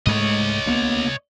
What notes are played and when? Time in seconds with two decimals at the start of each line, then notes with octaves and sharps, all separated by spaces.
0.06 G#2 G#3 A3 C#5 D#5
0.66 D2 A#3 B3